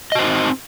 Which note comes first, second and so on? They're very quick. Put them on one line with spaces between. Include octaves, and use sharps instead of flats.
D#5 F#4 C5 D#4 C4